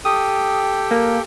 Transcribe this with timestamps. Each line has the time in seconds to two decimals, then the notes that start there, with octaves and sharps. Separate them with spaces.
0.05 G4 A4 G5 D#6
0.91 A#3